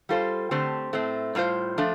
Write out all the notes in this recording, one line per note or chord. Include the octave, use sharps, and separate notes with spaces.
G3 F4 A4 C5
D3 A3 C4 G4 C5
A2 A3 C4
A2 G3 F4 C5
F3 A3 D4